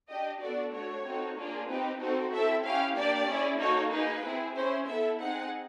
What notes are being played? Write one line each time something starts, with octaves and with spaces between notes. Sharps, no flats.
D4 G4 D#5
B3 D4 F#4 A4 D5
A3 D4 F#4 C#5
C4 D#4 F#4 A4
A#3 D4 F4 G#4
C4 D#4 G4 B4
C4 D#4 F#4 A4 C5
C4 E4 A4 E5
C#4 E4 G4 F5
A#3 D4 G4 D5
C#4 E4 G#4
A#3 D#4 F#4 A4 C#5
A#3 D#4 G#4 B4
C4 E4 G#4
C#4 E4 G#4 C5
B3 E4 A4 E5
C4 D#4 G#4 F#5